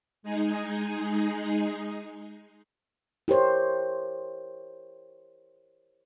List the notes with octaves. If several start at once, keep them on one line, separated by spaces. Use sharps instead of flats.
G#3 D#4 G#4
E4 G4 A#4 C5 C#5